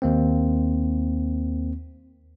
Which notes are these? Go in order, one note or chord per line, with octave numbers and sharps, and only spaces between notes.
D#2 A#3 C4